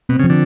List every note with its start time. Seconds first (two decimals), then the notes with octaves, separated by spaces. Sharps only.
0.09 B2 C4
0.19 C#3
0.24 F3
0.30 D3